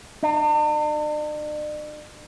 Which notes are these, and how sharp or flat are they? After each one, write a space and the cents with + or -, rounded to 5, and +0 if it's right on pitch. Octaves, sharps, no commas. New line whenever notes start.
D4 +45